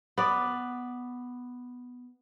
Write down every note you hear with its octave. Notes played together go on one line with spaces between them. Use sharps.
B3 D5